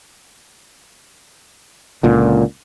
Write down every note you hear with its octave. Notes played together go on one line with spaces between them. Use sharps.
C#2 A#2 D3